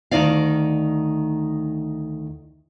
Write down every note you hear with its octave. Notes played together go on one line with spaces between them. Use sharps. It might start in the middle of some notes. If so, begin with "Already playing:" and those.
D2 D#3 F3 D#4 D5 F5